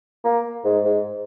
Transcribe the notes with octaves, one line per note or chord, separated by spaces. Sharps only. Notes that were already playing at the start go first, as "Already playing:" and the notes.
A#3
G#2
G#2